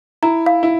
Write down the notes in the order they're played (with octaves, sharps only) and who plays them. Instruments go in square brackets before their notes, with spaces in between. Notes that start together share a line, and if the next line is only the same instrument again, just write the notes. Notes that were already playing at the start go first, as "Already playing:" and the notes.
[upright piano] E4 [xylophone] A#5
[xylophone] F5
[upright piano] E4